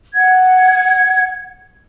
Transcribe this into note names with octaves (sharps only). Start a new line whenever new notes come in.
F#5 G#6